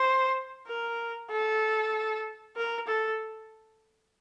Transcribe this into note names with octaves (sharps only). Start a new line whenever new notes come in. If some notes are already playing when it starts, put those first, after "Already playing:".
Already playing: C5
A#4
A4
A#4
A4